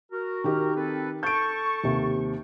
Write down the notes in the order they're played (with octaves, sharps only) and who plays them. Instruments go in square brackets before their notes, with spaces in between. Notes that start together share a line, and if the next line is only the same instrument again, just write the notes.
[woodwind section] F#4 A#4
[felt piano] D#3 G4
[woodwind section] C4 A4 B4
[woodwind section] A4 A5 C#6 [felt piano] G6 D7
[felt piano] D#2 C3